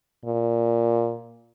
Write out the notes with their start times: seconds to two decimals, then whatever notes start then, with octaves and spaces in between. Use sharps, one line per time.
0.25 A#2